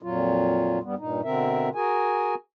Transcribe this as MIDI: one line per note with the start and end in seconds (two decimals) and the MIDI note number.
0.02 0.79 41
0.02 0.79 46
0.02 0.79 54
0.02 0.79 65
0.83 0.95 43
0.83 0.95 55
0.83 0.95 59
0.98 1.21 43
0.98 1.21 46
0.98 1.21 63
1.24 1.69 47
1.24 1.69 50
1.24 1.69 60
1.24 1.69 70
1.24 1.69 76
1.75 2.35 66
1.75 2.35 68
1.75 2.35 70
1.75 2.35 80